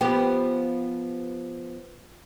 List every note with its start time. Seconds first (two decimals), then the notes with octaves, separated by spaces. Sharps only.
0.01 F3 B3 G4